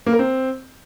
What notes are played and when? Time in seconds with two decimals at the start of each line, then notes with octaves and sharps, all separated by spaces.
0.06 A#3
0.13 A#4
0.19 C4